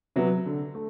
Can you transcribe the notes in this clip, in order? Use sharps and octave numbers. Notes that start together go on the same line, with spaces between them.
C3 F#3 B3
D3
A3